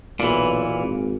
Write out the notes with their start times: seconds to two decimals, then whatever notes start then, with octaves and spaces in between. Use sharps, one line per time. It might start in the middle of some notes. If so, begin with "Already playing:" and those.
0.20 B1 A#2 E3
0.80 G#1